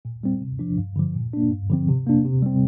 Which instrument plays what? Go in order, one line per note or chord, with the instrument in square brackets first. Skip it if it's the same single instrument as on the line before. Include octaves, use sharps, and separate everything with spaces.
[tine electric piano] A#2
G3 C4
C3
F3 D4
G2
D3 F3
A#2
A#3 D4
G2
D3 F3 C4
C3
A#3 D4
C3
G3 C4